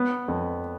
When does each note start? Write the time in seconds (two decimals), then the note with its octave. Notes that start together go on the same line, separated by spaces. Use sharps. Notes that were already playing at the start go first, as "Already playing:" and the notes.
Already playing: B3
0.28 F2